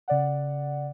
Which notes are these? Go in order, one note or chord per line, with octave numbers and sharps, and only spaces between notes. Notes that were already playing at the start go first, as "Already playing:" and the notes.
C#3 D5 F#5